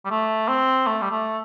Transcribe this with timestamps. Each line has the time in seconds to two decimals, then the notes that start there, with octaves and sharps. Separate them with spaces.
0.05 G3
0.10 A3
0.48 C4
0.87 A3
1.01 G3
1.11 A3